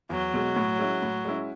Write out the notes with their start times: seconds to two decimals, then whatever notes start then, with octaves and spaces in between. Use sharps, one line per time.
0.10 E2 F#3
0.34 B2 G#3
0.56 A2
0.79 G#3 C#4 E4
1.02 A2
1.25 G#3 C#4 E4